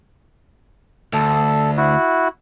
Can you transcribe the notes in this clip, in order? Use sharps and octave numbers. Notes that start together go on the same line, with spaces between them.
D2 A4
E4 F#4